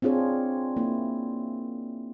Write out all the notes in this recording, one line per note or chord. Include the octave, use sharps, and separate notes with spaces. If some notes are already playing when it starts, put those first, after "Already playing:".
C4 D4 F4 G#4 C#5
A#3 E4